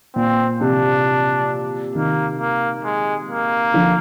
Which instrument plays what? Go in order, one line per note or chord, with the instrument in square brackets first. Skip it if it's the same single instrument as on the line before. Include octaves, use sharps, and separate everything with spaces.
[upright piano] A#2 [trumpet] C4
[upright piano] C3 [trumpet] D4
[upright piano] C3 D#3 [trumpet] A#3
[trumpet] A#3
G#3
A#3
[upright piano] D3 F3